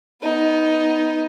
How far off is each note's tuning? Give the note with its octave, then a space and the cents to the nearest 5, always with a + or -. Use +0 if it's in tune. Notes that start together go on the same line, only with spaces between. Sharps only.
B3 +0 D#4 +10